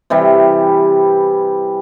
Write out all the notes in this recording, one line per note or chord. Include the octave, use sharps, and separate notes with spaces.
C3 E3 G3